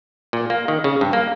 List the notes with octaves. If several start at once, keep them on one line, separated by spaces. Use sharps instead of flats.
A#2
A#3
D#3
C#3
G2
A#3